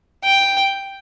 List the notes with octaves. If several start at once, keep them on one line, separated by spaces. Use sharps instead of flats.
G5